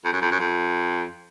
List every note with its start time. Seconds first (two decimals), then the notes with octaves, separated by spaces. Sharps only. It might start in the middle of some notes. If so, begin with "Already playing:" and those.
0.05 F2
0.13 F#2
0.22 F2
0.31 F#2
0.40 F2